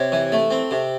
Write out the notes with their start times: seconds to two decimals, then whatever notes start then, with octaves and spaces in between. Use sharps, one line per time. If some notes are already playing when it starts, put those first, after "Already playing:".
Already playing: C3 C#5
0.12 E3
0.32 A3
0.50 C4
0.71 C3